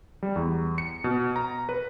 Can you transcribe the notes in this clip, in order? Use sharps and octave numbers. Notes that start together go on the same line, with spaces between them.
G3
E2
C#7
B2
A#5
B4